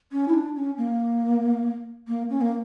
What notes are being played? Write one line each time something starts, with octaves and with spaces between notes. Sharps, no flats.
C#4
E4
D4
C#4
A#3
A#3
C#4
A#3